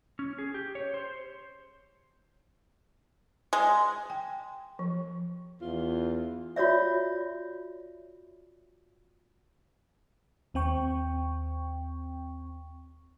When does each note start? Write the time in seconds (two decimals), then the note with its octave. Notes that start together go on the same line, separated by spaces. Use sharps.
0.19 C#4
0.38 G#4
0.54 G4
0.75 C#5
0.94 C5
3.53 G#3
4.10 G5
4.79 F3
5.61 E2 F4
6.56 F4 F#4 C#5 D5 E5
10.54 D#2 C4 G5 C#6